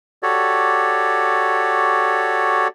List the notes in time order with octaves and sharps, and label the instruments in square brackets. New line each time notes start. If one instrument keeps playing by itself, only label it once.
[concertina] F#4 G4 A4 C#5 D5